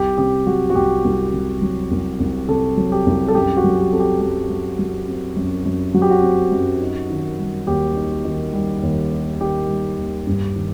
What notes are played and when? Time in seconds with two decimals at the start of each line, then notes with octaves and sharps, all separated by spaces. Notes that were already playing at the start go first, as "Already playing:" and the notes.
Already playing: C2 G4
0.18 C3 G4
0.46 F#3 F#4
0.70 F#4
0.75 C2 G4
1.04 C2
1.33 C3
1.62 F#3
1.91 C2
2.20 C2
2.48 C3 A4
2.77 F#3
2.92 G4
3.06 C2
3.28 A4
3.35 F#2 G4
3.57 F#4
3.64 F#3
3.78 G4
3.93 C4 A4
4.00 G4
4.21 F#2 G4
4.50 F#2
4.79 F#3
5.08 C4
5.36 F#2
5.66 F#2
5.94 F#3 F#4
6.02 G4
6.10 F#4
6.23 C4
6.52 F#2
6.81 D#4
7.10 D#3
7.38 G3
7.67 D#2 G4
7.96 D#4
8.25 D#3
8.54 G3
8.83 D#2
9.11 D#4
9.40 D#3 G4
9.69 G3
9.97 D#2
10.27 G2
10.55 D#3